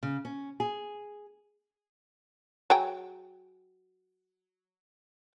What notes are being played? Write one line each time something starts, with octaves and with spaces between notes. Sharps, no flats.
C#3
C#4
G#4
F#3 G#4 G5